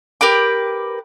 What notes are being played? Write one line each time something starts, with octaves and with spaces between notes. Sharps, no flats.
G4 A#4 B4 D6